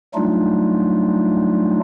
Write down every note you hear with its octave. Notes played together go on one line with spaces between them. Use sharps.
F#3 G3 A3 D4 D#4 F4